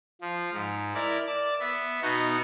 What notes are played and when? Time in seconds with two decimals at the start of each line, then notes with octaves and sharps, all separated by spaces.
0.21 F3
0.53 G#2
0.95 E4 A#4 D5
1.27 D5 A5
1.60 B3 E5
2.02 B2 B3 D#4 F#4